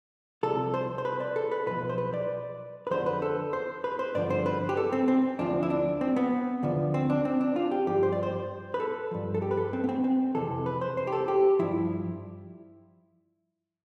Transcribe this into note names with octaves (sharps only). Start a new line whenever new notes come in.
C2 C3 F3 A4
C5
C5
B4
D5
A4
B4
B1 A2 F3 B4
C5
B4
D5
B4
F2 D3 F3 C5
B4
A4
C5
B4
C5
G2 D3 F3 D5
C5
B4
G4
A4
C4
C4
D2 D3 F3 D4
E4
D4
C4
B3
D2 D3 F3
C4
D4
C4
D4
F4
G4
G2 F3 G4
C5
D5
C5
B4
A4
G2 F3
A4
G4
B4
A4
C4
B3
C4
C4
F2 C3 E3 A4
B4
C5
C5
G4
A4
G4
G2 F3 E4